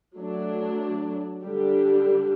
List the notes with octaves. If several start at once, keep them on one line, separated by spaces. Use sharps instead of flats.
F#3 A3 D4
D3 G3 D4 G4